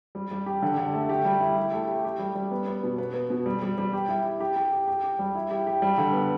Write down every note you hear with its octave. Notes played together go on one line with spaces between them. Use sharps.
G3
G3
G4
D3
D3
A3
G4
G3
E4
G4
A3
G4
G4
G3
G3
B3
B3
B2
B3
B3
B2
G3
G3
G3
G4
E4
G4
G4
G4
G4
G4
G4
G3
E4
G4
G4
G3
D3
B3